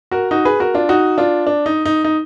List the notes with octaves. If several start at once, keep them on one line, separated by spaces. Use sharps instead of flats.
F#4 A#4
D#4 F#4
G#4 B4
F#4 A#4
D4 F4
D#4 F#4
D4 F4
D4
D#4
D#4
D#4